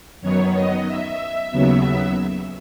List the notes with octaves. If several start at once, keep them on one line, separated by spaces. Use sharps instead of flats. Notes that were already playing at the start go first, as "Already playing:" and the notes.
F#2 D#3 F#3 B3 C#5
D#5
E5
D#2 C#3 F#3 B3